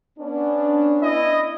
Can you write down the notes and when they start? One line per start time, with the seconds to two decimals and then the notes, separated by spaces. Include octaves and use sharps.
0.19 B3 C#4 D4
1.01 E4 D#5